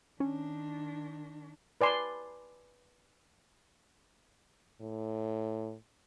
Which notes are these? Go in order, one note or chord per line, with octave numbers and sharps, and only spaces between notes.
D#3 C#4 D4
B4 D5 G#5 C6
A2